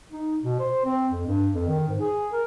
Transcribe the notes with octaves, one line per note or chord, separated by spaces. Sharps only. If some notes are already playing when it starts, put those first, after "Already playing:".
D#4
B2
C5
C4
F2
G2
F2
D#3
G#2
G#4
A#4